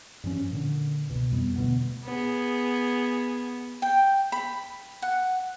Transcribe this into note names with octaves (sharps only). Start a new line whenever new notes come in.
G2 F3 C#4
A#2 D3
C#2 B2
F2 G3 B3
D2 B2 B3
B3 G#4
G5
B5
F#5